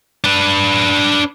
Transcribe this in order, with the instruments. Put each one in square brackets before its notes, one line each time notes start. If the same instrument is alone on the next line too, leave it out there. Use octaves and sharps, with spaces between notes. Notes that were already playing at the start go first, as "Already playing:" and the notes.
[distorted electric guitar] D4 B4